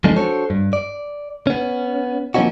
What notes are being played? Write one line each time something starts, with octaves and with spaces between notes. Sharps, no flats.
F3 G#3 C4 D4 D#4 A4
D4 F#4 A4 C5 C#5
G2
D5
B3 C#4
F3 A#3 C4 C#4 D#4 F#4